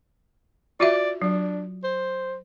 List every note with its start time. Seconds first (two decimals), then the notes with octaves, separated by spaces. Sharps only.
0.80 F4 F#4 D5 E5
1.22 F#3 D4
1.84 C5